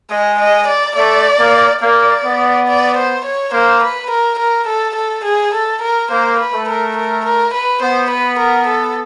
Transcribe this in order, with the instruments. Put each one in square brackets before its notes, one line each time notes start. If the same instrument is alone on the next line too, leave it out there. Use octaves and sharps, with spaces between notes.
[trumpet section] G#3 [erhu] D#5
[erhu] D#5
D5
[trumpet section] A3 [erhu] D5
[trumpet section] A#3
[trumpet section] A#3 [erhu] D5
[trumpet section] B3
[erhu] D5
C5
C#5
[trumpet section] A#3 [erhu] C5
[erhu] B4
A#4
A#4
A4
A4
G#4
A4
A#4
[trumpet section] A#3 [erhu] C5
[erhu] B4
[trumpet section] A3
[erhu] A#4
A#4
A#4
B4
[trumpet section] B3 [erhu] C5
[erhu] B4
A#4
A4